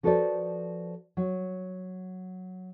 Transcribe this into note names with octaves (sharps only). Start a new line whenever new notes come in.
F3 F#4 A4 B4 C5 D5
F#3